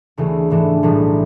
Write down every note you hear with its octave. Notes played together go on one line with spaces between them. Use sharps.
D2 C#3 E3 A3
G#2 E3 A3 D4
B1 A2 E3 G3